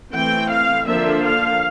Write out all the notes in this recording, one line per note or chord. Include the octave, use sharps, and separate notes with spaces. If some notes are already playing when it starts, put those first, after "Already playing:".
E3 A3 C4 G5
F5
D3 F3 A#3 D4 E5
F5